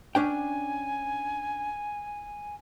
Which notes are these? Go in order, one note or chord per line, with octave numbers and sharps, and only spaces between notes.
C#4 D4 G5 G#5